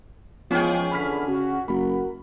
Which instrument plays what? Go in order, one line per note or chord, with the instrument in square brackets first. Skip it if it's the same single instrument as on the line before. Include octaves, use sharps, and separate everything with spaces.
[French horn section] E3 G#3 F4 [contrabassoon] F3 [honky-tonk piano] B3 G5 [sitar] C#4 G#4
[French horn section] E2 D3 [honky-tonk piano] B5 F6 B6
[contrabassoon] C#3 [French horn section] F#4
[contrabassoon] F#1 [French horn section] F#4 A#4 [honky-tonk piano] B5